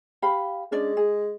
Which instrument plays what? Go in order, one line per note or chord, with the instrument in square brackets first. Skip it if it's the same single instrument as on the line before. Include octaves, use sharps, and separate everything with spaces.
[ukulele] G4 F5 B5
[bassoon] G#3 [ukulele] C#4 D4 D5
[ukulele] G#4